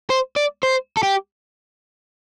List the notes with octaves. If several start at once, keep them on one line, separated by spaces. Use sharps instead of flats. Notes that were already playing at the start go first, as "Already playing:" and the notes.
C5
D5
C5
A4
G4